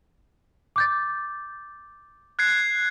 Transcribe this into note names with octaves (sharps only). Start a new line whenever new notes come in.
D6 G6 A6
F#6 G#6 C7